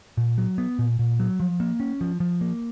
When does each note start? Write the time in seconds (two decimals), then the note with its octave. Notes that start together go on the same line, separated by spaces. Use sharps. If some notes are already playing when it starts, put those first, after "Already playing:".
0.17 A#2
0.38 F#3
0.58 B3
0.79 A#2
0.99 A#2
1.20 F#3
1.40 F3
1.60 A#3
1.80 C#4
2.01 F3
2.20 F3
2.41 A#3